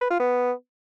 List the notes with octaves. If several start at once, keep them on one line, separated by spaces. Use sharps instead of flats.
B4
F4
B3